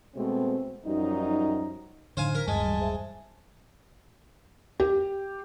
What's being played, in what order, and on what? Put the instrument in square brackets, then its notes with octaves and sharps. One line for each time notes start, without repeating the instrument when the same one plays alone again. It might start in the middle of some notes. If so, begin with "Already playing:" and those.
[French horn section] B2 G#3 A3 C4
F#2 F3 G3 D#4
[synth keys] A2 D#4 [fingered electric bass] D3 [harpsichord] C5 F5 G#5
[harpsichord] A#4 [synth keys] F6 B6
[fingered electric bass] D1 G2 [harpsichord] G#3 [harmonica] G#5 A5
[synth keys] E3 F#3 G3
G#4 C5 E5
[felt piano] G4